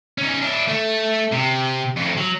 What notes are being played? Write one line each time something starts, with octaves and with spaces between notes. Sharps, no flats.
C#4 D#4
D4 E4
A3
C3
F2 A2
F#3